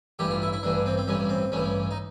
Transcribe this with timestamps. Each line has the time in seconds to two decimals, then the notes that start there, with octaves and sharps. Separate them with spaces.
0.19 A1 G2 E3 G4
0.31 F4
0.42 E4
0.53 E4
0.63 A1 G2 E3 D4
0.86 C4
0.97 C4
1.07 A1 G2 E3 C#4
1.29 C4
1.52 A1 G2 E3 C#4
1.91 D#4